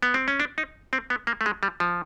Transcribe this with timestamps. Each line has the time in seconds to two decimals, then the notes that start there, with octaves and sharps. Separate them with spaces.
0.03 B3
0.14 C4
0.28 C#4
0.40 D4
0.58 D#4
0.93 C4
1.10 B3
1.27 A#3
1.41 A3
1.46 G#3
1.63 G3
1.80 F3